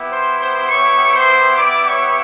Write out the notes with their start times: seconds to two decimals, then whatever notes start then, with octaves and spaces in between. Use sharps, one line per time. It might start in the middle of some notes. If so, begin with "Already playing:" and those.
Already playing: B3 E4 G4
0.11 C5 C6
0.40 C5 C6
0.69 C#5 C#6
1.14 C5 C6
1.57 D5 D6
1.87 C#5 C#6